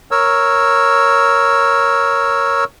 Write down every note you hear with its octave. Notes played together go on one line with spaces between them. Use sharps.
A#4 C#5 E6